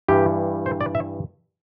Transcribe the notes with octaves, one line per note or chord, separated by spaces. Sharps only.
G2 E3 G3 G4
C5
D5
E5